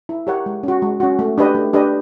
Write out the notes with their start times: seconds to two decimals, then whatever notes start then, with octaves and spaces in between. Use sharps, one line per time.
0.09 E4
0.27 G4 A#4 C#5 F#5
0.46 G#3
0.63 C#4 F#4
0.82 G#3
1.00 C#4 F#4
1.19 A3
1.38 D4 G4 B4 D#5
1.55 A3
1.73 D4 G4 B4 D#5